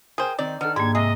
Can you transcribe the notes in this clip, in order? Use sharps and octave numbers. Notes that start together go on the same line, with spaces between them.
G#4 A#4 C5 G5 G#5
D#3 C4 D#4 D5
D#3 B3 D4 A4 F6
G#2 A#3 G4 G#6
C3 G#3 G#4 D#5 E5